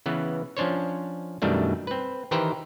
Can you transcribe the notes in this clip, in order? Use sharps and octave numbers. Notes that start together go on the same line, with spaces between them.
C#3 E3 B3
F3 C#4 D4 C5 C#5
F#2 B2 D#3 G3 A3 D4
C4 B4
D#3 E3 G4 B4 C5 A#5